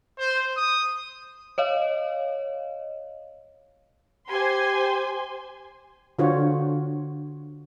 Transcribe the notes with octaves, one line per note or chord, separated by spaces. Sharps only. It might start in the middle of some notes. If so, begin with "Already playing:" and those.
C5
D#6
C#5 D#5 F5
G4 C5 G#5 C6
D3 D4 F4 F#4 C5 C#5